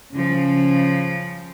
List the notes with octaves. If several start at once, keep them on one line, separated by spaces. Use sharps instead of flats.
C#3 F3